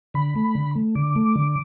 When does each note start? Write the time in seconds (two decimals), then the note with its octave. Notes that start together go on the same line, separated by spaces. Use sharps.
0.14 D3 B5
0.36 A3
0.55 D3
0.75 A3
0.95 D3 D6
1.16 A3
1.36 D3